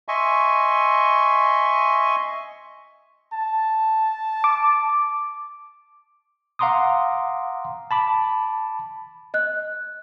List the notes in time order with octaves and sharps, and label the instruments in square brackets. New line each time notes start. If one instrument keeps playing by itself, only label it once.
[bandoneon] D#5 E5 G#5 C6 C#6
[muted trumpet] A5
[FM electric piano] D6
[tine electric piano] F5 F#5 A#5 C6 D6 D#6
A5 B5 D6
[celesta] D#5 F#6